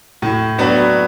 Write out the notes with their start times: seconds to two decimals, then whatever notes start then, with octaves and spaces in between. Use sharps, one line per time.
0.22 A2
0.58 F#3 B3 D4 F#4